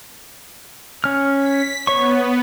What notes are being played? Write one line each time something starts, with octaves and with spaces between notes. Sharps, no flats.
C#4 F6
B6
B3 C#5 C#6